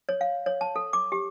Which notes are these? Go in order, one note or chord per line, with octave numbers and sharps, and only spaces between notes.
C#5
F5
C#5
A5
A4
D6
G4